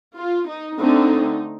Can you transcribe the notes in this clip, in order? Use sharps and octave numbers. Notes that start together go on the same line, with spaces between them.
F4
D#4
D3 A3 C4 D#4